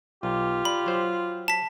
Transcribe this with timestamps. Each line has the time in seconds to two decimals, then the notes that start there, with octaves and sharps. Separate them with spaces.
0.23 B1 F4 G4
0.65 D5 B5
0.86 F#3 C5
1.48 A5 B6